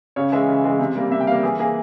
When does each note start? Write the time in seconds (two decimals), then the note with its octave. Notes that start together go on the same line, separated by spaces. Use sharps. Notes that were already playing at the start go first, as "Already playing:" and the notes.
0.16 C#3 C#5
0.32 E3 G#3 E5
0.48 C#3
0.64 E3 G#3
0.79 C3
0.96 G3 A#3
1.11 C3 E5
1.21 G5
1.27 G3 A#3 F5
1.43 E3 G#4
1.59 A#3 G#4